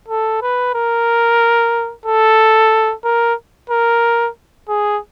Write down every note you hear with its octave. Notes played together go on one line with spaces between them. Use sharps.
A4
B4
A#4
A4
A#4
A#4
G#4